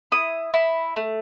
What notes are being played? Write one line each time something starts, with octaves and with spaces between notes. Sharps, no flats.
E4 D#6
E4
A3